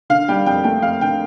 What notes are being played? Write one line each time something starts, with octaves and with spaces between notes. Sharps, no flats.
D3 F5
G3 G5
F2 G5
A3 G5
F2 F5
D3 G5